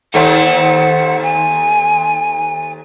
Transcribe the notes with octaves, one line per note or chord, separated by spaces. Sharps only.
D#2 A3 C4 F#5
G#5